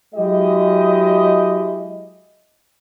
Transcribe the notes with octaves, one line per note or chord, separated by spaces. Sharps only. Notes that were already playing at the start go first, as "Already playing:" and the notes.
F#3 G#3 E4 G4 D#5